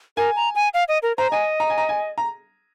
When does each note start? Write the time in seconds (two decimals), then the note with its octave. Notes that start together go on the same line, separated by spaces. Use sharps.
0.17 A#4 G#5
0.36 A#5
0.55 G#5
0.74 F5
0.88 D#5
1.03 A#4
1.17 C5 A#5
1.31 D#5 G#5
1.60 A#5
1.70 G#5
1.78 A#5
1.89 G#5
2.18 A#5